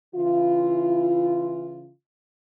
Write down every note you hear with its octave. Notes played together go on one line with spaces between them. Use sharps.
C#3 E3 E4 F4